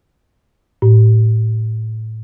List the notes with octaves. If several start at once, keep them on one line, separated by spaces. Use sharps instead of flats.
A2